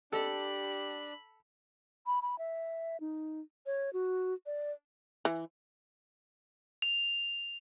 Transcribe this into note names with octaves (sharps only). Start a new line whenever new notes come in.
D4 G4 A4 B5
B5
B5
E5
D#4
C#5
F#4
D5
E3
F7